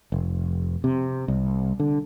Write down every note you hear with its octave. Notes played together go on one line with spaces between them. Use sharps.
F1
C3
C2
D3